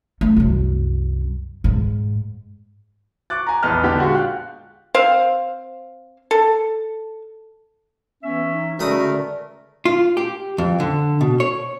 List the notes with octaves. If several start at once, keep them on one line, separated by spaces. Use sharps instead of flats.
A3
C2 F#2
G#2
C#6 D6 F#6 A6
G#5 A#5
A#1 E2 B4 D#5 A5 F6
D3 B3 D4 G4
A#2 G#3 F4 F#4 F#5
F5 G5 F#6
C4 C5 F5
A4
E3 B3 C#4 E5
D#4
C#2 D3 A3 F#4 A#4 D5 B5 D#6
F4
G4
F2
D3
B2
C#5